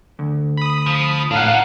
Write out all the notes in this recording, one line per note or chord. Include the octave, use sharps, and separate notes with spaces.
D2
B5 D#6
F3
A2 D4 D#4 F5 F#5